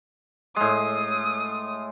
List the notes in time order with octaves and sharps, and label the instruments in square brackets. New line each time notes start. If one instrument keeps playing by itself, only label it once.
[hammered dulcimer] A2 G#3 [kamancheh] D#6